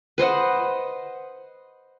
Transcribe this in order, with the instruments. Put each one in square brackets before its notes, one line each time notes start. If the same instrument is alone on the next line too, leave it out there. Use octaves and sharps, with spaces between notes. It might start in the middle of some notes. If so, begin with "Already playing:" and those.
[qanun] B4 C5 D#5 F#5